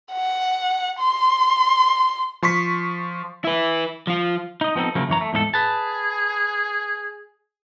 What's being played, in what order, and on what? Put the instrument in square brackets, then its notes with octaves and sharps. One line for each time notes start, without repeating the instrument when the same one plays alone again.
[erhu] F#5
C6
[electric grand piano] F3 C6 C#6 B6
[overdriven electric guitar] E4 B4
F3 F4
[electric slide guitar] D#4 D#5
F3 B3 C4 D#4 A4
C#3 F3 F#3 A3 A#3
F#2 E3 C#5 A#5
A3
E2 G#2 D#4 A4
[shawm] G#4 [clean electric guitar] B4 A5